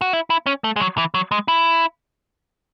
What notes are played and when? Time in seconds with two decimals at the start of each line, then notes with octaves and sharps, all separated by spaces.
0.01 F#4
0.13 E4
0.30 E4
0.46 C#4
0.64 A3
0.76 G#3
0.80 F#3
0.98 E3
1.14 F#3
1.31 G#3
1.48 E4